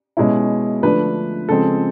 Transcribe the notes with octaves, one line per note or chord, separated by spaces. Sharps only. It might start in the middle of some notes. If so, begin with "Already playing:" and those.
B2 G#3 C#4 E4
D3 F3 A3 D4 B4
C#3 F3 G#3 C4 A4